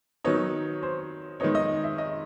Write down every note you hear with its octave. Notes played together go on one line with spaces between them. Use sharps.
D#3 F#3 B3 D#4 C#5
C5
D#3 G#3 B3 D#4 C#5
D#5
E5
D#5